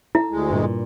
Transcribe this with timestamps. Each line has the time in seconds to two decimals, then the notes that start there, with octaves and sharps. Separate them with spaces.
0.15 E4 A4
0.31 D2 G#3
0.50 G2 A#2